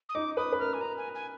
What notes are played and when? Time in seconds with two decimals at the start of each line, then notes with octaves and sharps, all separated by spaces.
0.09 D#6
0.15 D#4 D6
0.37 B4 D#6
0.52 B4
0.59 A#4 F6
0.74 G#5
0.81 A#5
0.97 G#5
1.15 G#5